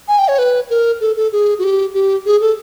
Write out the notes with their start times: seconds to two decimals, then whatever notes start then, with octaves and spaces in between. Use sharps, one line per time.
0.08 G#5
0.19 G5
0.28 C#5
0.38 B4
0.70 A#4
1.01 A4
1.17 A4
1.32 G#4
1.59 F#4
1.64 G4
1.94 G4
2.26 G#4
2.41 A4